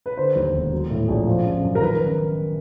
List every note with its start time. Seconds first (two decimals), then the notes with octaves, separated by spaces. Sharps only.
0.06 B4
0.17 D3 C5
0.35 D#2
0.54 E1
0.72 F#3
0.90 A2
1.08 A#1
1.27 F3
1.45 C#3
1.63 F#2
1.75 A#4
1.81 D#3 B4